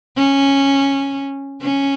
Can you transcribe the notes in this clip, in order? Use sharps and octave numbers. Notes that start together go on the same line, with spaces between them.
C#4
C#4